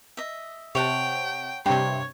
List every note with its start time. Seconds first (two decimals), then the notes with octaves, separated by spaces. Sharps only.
0.17 D#5 E5
0.75 C3 C#5 F#5 G5 A5
1.66 G2 C3 C#5 G5 C6